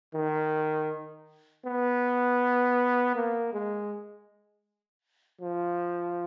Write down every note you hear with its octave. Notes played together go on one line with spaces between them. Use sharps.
D#3
B3
A#3
G#3
F3